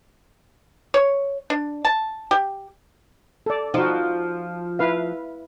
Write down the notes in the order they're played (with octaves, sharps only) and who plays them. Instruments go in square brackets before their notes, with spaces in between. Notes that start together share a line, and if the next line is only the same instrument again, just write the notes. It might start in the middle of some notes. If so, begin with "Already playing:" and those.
[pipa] C#5
D4
A5
G4
[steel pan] A4 D5
[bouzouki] F3 [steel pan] D#4 F#4
[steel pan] E4 B4 F5